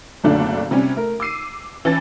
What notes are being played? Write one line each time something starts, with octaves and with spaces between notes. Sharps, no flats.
F#1 B1 D3 A3 D4
C3 G3 C#4
A3 A#4
D6 E6 C7 D#7
E3 C#4 A5 A6